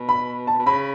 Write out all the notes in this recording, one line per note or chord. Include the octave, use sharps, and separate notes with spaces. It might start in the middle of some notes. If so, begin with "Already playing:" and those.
Already playing: B2
B5
A5
B2
C#3 B5